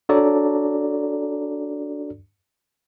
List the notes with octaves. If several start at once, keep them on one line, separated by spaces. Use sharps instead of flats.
D4 F#4 A4 C#5 D5 A#5